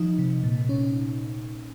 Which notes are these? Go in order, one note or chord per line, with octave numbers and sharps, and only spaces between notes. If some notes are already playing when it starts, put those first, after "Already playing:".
Already playing: F3 D#4
C3
A#2
C#4